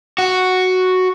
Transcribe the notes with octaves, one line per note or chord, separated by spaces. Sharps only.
F#4